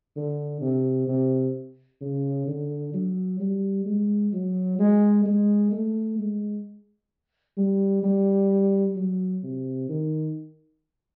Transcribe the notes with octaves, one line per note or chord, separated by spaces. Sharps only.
D3
C3
C3
C#3
D3
F#3
G3
G#3
F#3
G#3
G#3
A3
G#3
G3
G3
F#3
C3
D#3